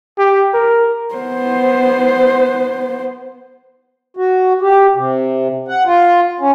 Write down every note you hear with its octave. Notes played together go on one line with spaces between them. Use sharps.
G4
A#4
B3 C5
F#4
G4
C3
F#5
F4
C#4